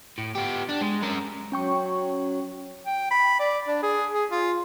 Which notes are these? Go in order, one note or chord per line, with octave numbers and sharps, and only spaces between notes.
A2
B3 G4
D4
G#3
C#4 A#4
F#3 C#4 G5 C#6
G5
B5
D5
D4
G#4
G#4
F4